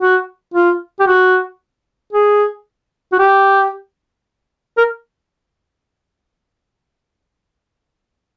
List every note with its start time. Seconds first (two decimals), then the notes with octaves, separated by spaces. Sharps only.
0.01 F#4
0.54 F4
1.00 G4
1.07 F#4
2.13 G#4
3.13 F#4
3.19 G4
4.78 A#4